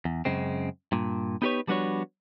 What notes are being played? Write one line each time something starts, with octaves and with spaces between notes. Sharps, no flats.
E2
F#2 C#3 G#3 C4
G2 A#2
B3 D#4 G4 A#4 B4 C#5
F3 G3 B3 D4 F#4 C#5